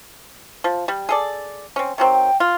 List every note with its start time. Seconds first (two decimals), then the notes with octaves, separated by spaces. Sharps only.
0.64 F3
0.88 G3
1.09 G#4 A4 D5
1.76 C4 C#4
1.98 D#3 F#3 C4 G5
2.40 F4